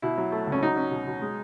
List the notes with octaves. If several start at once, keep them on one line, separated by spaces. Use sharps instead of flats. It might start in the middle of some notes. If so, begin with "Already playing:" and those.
B2 E4
F#3
A3
C#2
C#4
F#3 D#4
C#4
B2
B2
G#3